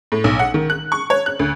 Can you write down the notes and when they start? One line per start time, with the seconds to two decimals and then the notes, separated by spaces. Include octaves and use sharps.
0.12 A2
0.24 B1
0.39 F#5
0.54 D#3
0.70 F#6
0.92 C#6
1.10 C#5
1.26 F#6
1.39 D2